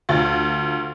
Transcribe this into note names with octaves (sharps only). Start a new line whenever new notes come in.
D2 F4 A6